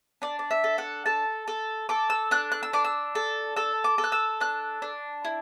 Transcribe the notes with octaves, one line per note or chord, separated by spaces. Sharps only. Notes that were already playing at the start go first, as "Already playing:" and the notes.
D4 D5
D5
E5
A4
F#5
A4 A5
A4
A4 D6
E6
D4 F#6
F#6
E6
D4 D6
E6
A4
A4 E6
D6
A4
F#6
E6
D4 F#6
D4
E4